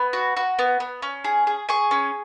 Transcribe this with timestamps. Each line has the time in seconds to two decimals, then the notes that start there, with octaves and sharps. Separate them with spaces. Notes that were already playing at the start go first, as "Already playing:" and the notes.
Already playing: B3 B5
0.13 F#4
0.37 F#4
0.59 B3
0.80 B3
1.02 C#4
1.24 G#4
1.47 G#4
1.69 G#4 G#5 C#6
1.91 C#4